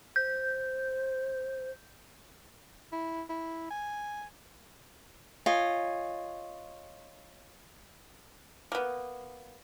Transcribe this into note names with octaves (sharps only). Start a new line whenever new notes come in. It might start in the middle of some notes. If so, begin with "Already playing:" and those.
C5 G6
E4
E4
G#5
F4 C#5 D#5 G#5
A#3 B3